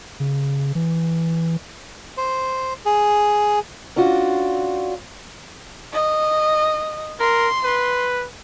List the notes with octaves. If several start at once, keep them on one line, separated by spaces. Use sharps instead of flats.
C#3
E3
C5
G#4
C#4 D4 F4 F#4
D#5
A#4 C6
B4